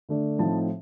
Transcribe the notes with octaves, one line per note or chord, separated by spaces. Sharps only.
D3 A3 D4
A2 F3 C4 D#4 A5